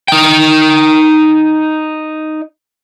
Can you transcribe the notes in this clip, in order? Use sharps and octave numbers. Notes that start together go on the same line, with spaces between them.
D#4 G5